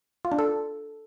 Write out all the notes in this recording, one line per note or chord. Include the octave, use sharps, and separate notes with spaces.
F4
D4
A4